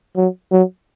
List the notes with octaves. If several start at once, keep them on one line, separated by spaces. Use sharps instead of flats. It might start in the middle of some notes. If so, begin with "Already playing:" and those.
F#3
F#3